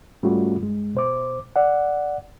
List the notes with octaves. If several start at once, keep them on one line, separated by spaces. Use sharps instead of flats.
G#2 G3 A3 C#4 F4 F#4
G2 G#3
B2 C5 D6
D5 F#5